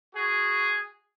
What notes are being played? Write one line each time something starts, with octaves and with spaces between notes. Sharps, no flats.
F#4 G#4